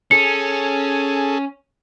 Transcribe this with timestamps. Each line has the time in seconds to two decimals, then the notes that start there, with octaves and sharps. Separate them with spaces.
0.11 C#4 G#4 A4 C#7